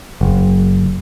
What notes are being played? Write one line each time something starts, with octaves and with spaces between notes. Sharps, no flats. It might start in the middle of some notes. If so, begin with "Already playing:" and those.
F#1